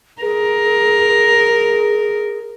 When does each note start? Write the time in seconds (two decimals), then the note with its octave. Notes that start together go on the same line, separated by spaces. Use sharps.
0.22 G#4 A#4